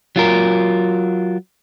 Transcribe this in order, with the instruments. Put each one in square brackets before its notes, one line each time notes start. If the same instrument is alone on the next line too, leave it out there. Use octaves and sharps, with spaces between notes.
[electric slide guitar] F#3 F4 A#4